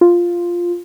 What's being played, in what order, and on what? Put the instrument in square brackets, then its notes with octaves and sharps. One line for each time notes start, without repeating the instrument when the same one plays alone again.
[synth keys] F4